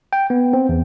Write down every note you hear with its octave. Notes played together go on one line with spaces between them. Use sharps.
G5
B3
C4
E2